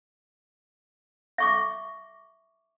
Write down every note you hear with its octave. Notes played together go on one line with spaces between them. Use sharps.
E5 C#6 D6